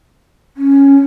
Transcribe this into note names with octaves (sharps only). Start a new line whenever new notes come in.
C#4